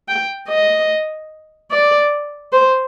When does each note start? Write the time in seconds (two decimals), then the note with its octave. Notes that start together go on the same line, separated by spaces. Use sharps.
0.08 G5
0.49 D#5
1.71 D5
2.53 C5